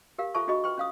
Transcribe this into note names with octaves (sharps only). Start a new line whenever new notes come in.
G4 A#4 F5
F4 A4 C5 E5 A5 C#6
D4 F#4 G#4 D#5 B5 C#6
B4 G5 C6 C#6
C#4 F5 D#6